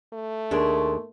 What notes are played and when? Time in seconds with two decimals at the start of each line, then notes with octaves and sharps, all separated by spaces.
0.13 A3
0.51 D#2 D4 G#4 A#4 C6 C#6